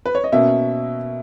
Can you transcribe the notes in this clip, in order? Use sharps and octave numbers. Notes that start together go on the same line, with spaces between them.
B4
C#5
D#5
B2 A#3 C#4 E5